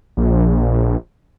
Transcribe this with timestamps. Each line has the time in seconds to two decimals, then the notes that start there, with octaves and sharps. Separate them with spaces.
0.17 A#1